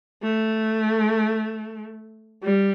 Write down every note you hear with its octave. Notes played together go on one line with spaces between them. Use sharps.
A3
G3